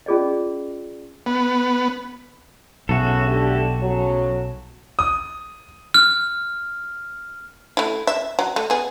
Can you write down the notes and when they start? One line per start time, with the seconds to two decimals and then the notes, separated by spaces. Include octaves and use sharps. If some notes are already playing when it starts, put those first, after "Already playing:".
0.06 C#4 F4 G#4 D5 D#5
1.26 B3
2.89 B1 C#3 F#4 A4 E5
3.27 D3 A3 G4
3.79 C#3 F#3
4.99 D#6
5.94 F6
7.77 A3 E4
8.07 E5
8.39 F#3
8.56 A3
8.70 B3 G#4